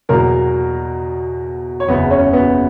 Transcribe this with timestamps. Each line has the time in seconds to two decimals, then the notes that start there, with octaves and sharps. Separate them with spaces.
0.09 E2 B2 F#3 A#3 A#4
1.80 C#5
1.88 F#1 E2 C#3 B3 B4
2.11 C#4 C#5
2.33 B3 B4